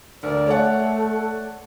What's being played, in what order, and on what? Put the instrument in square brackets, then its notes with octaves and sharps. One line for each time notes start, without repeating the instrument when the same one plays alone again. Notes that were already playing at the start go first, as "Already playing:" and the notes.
[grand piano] D2 A#4 [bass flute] D5
[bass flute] A3 [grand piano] C#5 D5 F#5